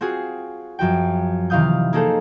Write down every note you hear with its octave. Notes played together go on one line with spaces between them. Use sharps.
C4 F4 F#4 G#4
F#2 F3 F#4 G5
C3 D#3 E3 F5 D#6 G6
A#3 D#4 G#4 A4 C5